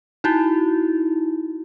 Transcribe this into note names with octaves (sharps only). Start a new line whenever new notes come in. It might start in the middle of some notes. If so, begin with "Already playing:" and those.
D#4 E4 F#4